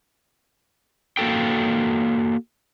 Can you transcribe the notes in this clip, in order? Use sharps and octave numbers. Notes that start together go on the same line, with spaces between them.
A#3 F#4 A4 G5